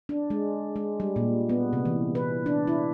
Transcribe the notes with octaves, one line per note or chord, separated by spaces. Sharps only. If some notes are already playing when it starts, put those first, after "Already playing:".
D4
G#3
G#3
G3
A#2
B3
C3
E3
B4
D4
E4